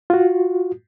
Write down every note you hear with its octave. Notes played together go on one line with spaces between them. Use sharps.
F4 F#4